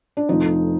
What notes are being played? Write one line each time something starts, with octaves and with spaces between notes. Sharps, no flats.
D4
F1 F2 F3 D#4